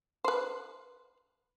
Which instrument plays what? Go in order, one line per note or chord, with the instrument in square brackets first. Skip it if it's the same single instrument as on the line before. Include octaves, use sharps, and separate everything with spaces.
[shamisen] B4 C5